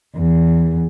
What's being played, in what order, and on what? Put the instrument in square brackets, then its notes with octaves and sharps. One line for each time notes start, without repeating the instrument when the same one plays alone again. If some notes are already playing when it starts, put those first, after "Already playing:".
[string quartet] E2